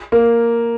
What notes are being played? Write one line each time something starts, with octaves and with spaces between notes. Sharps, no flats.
A#3